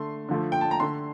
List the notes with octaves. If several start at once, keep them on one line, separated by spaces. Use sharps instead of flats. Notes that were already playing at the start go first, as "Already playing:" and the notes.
Already playing: D3 A3 C6
D3 F3 A3
G5
A5
A#5
D3 A3 C6